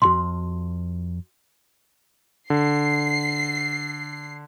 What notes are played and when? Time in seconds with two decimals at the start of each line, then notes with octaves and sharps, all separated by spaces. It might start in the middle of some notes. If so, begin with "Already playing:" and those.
0.02 B1 F2 F#4 C6
2.50 D3 C7